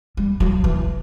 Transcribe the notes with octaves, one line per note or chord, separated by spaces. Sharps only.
G3
F#3
E3